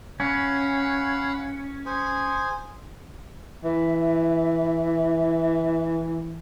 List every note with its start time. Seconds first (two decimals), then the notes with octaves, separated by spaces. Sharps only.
0.20 C#4 F5 F#5 B5
1.86 G#4 C5 G#5
3.64 E3 E5